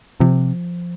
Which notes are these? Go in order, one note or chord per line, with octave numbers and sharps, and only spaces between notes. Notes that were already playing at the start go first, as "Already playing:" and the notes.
C3 F3